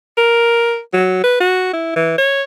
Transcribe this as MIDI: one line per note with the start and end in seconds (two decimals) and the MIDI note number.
0.18 0.79 70
0.93 1.23 54
1.24 1.40 71
1.40 1.68 66
1.73 1.91 64
1.96 2.15 52
2.18 2.43 73